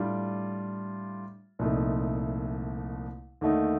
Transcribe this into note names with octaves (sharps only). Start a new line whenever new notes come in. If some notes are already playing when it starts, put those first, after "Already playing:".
Already playing: A2 G3 D4 F4
C2 A#2 F3 A3 D#4
D#2 D3 A3 D#4